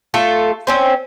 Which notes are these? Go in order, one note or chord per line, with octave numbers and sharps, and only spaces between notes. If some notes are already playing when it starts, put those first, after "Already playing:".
A3 F4 A4
C4 C#4 C5